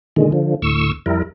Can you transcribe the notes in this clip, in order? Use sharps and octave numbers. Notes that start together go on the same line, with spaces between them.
A#2 D3 D#3 G#3
D3 F3
D2 A2 C#6 E6
F2 G3 E4 A#4